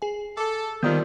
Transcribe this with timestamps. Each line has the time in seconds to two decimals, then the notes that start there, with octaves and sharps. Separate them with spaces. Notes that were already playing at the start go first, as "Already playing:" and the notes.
0.02 G#4 G#5
0.37 A4 D6
0.83 A#2 D#3 F3 G3 B3 F4 D5 G6